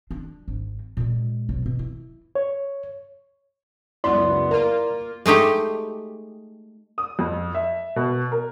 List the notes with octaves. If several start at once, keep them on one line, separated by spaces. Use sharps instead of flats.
D4
G#1
A#2 G#3
B1
B2
E4
C#5
C#2 F#2 B3 E4 D5 C6
A#3 F4 A#4
G#3 A3 D#4 G4
D#6
F2
E5
B2
A#4